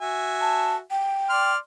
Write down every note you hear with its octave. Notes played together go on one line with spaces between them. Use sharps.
F#4 E5 G#5
A5
G5
D5 C6 F6